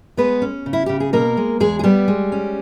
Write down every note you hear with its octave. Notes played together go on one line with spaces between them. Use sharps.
G#3 B3 B4
C#4
C#3
E4
C#3 G4
G#4
B2 A#3 A#4
G#3
E2 G#3 G#4
G#4
G3 B3 G4
G#3
C#4